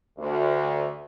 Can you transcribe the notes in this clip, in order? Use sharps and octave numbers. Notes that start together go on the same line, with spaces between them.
D2